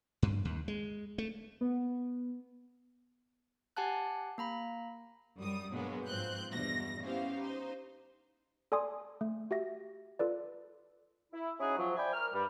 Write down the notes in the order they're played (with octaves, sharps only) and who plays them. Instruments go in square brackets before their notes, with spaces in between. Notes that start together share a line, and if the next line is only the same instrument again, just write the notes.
[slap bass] G2
D#2
G#3
A3
[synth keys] B3
[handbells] G4 F#5 G#5 A5 F#6
A#3 A#5 B5
[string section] F#2 G3 D#6
G2 B2 F#3 G#3 A#3 B3
G#2 F3 C4 F#6 G6
E2 G2 B2 A#6
B3 C#4 E4 G4 C5 F5
D#4 C5
[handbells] A4 D5 G#5 C6 D#6
A3
F#4 G4 E5 A#6
F4 A4 B4 D5
[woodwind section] E4
C#4 D#4 E4 F#4 G#4
F3 F#3
C5 D5 E5 G5 G#5 B5
A#4 F6
G2 G3